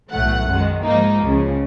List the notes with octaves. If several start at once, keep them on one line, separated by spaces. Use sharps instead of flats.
B1 A2 E3 A3 F#5
F#2 D#3 G#3
G#2 F3 A#3 D#4
C#2 C#3 F3